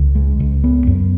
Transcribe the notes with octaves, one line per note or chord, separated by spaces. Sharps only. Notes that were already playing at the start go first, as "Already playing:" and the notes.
Already playing: C#2
G#3
C#2
B3
F#2